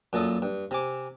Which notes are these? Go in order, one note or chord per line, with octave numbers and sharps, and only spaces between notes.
F#2 A#2 A4 D#6
G2
C3 G#5 D6